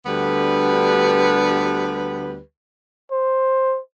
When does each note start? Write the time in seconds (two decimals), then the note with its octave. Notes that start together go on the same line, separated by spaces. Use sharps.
0.06 D2 D3 G3 B3 G4 B4
3.11 C5